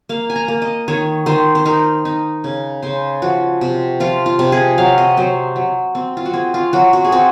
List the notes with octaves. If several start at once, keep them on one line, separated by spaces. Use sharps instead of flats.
A#3 F5
G#5
A#5
A#3
D#5
D#3 C#5
D#3 C5
C5
D#4 A#4
D#4
C#3
C#3 C5
F3 F#4
C3
F3 F4
F4
C3
G#4
F#3 F5
D#5
F#3 C5
F#3
C4
F4
F#4
C4 G#4
F4
F#3 F#4
F#4
G#4
C4 F#4